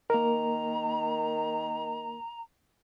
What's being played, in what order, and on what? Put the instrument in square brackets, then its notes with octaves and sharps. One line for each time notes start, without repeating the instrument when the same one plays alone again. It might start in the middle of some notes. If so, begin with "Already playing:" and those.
[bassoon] D#3 [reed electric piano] A#3 A#4 [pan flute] A#5